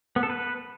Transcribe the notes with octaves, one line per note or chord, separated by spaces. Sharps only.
B3
A4
B4